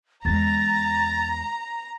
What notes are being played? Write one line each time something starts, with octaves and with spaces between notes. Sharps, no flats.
E2 G#3 A#5 A6